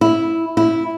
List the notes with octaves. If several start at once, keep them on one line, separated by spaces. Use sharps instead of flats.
E4
E4